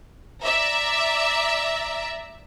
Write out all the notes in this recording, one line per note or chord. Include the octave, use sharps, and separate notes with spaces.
D5 E5 A#5